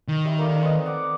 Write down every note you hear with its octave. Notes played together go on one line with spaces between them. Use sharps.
D#3
G3 E5 C6
A3 A#3
C4 B4 D#5
D5 F#5 D6